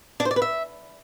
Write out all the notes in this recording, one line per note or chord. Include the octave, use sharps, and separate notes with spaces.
D4
C5
D5
B4
E5